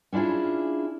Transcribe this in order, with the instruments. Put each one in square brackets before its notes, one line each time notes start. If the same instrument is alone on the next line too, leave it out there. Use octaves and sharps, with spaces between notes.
[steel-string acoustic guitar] C#4 D4 E4 F4 G#4